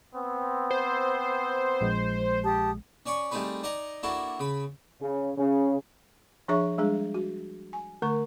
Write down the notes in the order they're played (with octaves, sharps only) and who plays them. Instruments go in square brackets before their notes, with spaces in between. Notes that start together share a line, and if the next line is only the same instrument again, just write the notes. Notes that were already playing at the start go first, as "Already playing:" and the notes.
[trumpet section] B3 C4
[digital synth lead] C5
[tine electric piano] A#1 G#3
[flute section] G4 A5 D#6
[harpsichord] C#4 D5 G#5 C#6
G3 A3 C4 D#4 G#4 B4
D#4 D5 D#5 G#5 A#5
A#3 D4 E4 F#4 A4
C#3 B5
[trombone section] C#3
C#3
[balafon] F3 D4 G#4 C#5 E5 C#6
G3 G#3 D4 G#4
F#4
G#5
D3 A3 A#4 C#6